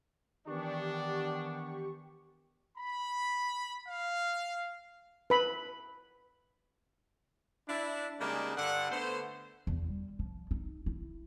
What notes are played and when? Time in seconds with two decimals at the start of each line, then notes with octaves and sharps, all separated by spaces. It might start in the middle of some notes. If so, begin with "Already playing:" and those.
0.47 D#3 E3 B3 D4 G4 C#6
2.76 B5
3.87 F5
5.30 B4 B5
7.68 D4 E4
8.19 C#3 G3 G#3 A#3 D4 D#4
8.56 G2 D3 F#5
8.91 D3 A3 B3 C5
9.67 E2
9.88 G3
10.19 F3
10.51 D#4
10.86 E4